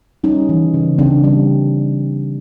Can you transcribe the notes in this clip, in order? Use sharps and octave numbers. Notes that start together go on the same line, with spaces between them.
G3 C#4 D#4
E3
C#3
C#3 C4 D4
G3